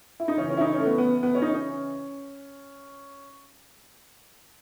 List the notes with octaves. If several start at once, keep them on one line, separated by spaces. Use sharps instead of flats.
E4
D#4
C#3 E3 C#4
C#4
E4
D#4
C#4
A3
B3
B3
B3
C#4
D#4
C#4